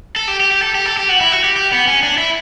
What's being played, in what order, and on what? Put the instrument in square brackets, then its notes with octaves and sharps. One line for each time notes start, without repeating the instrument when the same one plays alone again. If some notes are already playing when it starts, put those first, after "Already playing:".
[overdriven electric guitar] A4
G4
G4
G4
A4
G4
A4
G4
F#4
E4
F#4
G4
G4
B3
C#4
D4
E4